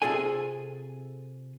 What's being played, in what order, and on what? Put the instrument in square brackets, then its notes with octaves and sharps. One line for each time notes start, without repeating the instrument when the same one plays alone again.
[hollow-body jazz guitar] C3 G#3 F4 G#4 A4 G#5